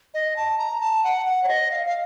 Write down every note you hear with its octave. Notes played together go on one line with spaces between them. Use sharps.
D#5
A5
A#5
A5
F#5
F#5
C#5
D#5
F5
F5